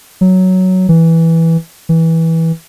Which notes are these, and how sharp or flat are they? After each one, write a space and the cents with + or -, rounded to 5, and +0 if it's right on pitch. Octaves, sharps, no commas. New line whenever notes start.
F#3 +5
E3 -5
E3 -15